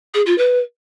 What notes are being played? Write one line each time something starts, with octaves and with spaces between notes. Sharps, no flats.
G#4
F4
B4